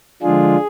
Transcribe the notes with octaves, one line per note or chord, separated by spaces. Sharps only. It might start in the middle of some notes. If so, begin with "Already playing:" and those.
D3 F3 G#3 D4 F4 G#4